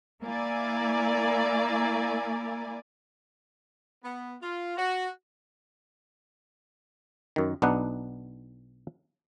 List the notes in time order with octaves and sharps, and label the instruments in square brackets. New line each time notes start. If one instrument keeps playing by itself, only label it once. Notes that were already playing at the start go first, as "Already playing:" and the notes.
[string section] A#3 E4 D5 G#5 A#5
[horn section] B3
F4
F#4
[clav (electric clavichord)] F#2 D#3
B1 B3 D4 D#4 F#5